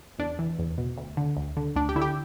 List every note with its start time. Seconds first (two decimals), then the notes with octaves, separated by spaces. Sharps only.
0.18 E2 D4
0.39 E3
0.59 E2
0.78 B2
0.98 D2
1.17 D3
1.37 D2
1.57 D3
1.76 D2 D4
1.89 G4
1.95 D3 E4
2.02 G4